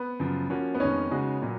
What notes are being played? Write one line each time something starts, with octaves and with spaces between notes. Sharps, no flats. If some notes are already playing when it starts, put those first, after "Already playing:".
Already playing: B3
F#2 C#3 F3
F3 A#3 C#4 F#4
B3
F2 D#3 G#3 C#4 D#4
C#3 G#3 D#4 F#4
A#2 F#3